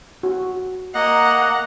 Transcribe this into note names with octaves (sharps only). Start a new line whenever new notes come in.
F#4
A#3 D#5 F#5 A#5